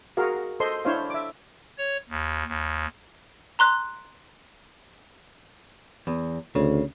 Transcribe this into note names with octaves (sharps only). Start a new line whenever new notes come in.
F#4 G#4 A#4 F5
A4 C5 D#5 C6
D4 E4 C5 C#5 F5
E5 D6
C#5
D#2
D#2
A#5 C6 F#6
E2
D2 C#3